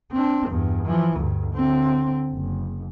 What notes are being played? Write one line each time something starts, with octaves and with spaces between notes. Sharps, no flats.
C4 D4
E2 G2
E3 F3
D2 G2
D3 C4
F#1